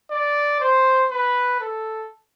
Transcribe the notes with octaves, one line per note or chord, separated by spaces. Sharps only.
D5
C5
B4
A4